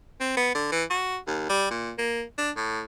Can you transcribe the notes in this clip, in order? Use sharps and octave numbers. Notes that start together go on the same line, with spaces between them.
C4
B3
D3
E3
F#4
D#2
G3
A#2
A#3
D4
A2